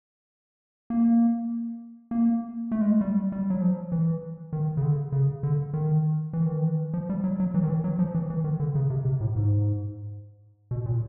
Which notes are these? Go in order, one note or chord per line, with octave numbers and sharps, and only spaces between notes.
A#3
A#3
A3
G#3
A3
G3
G3
F#3
F3
E3
D#3
C#3
D3
C#3
D3
D#3
E3
D#3
E3
F3
G3
F#3
F#3
E3
D#3
E3
F#3
F3
E3
E3
D#3
D3
C#3
C3
C3
A2
G#2
B2
A#2